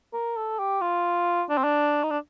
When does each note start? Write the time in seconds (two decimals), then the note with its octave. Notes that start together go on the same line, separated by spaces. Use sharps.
0.13 A#4
0.37 A4
0.59 G4
0.81 F4
1.49 D4
1.58 C4
1.64 D4
2.04 D#4
2.11 D4